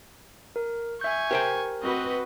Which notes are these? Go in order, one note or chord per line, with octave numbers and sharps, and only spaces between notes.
A#4
E5 G#5 C#6 G6
G4 A#4 C5 G5
C4 F#4 B4 D#5